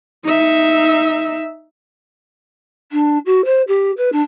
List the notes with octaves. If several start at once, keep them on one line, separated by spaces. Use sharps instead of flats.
D#4 E5
D4
F#4
C5
G4
B4
D4